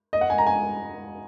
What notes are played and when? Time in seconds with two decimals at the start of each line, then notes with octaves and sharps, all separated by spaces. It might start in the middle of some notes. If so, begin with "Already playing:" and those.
0.13 D#5
0.21 F#5
0.30 G#5
0.38 A#5
0.47 G#5